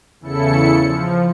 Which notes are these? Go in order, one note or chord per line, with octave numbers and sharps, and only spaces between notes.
E2 C#3 E4 A4 C#7
F3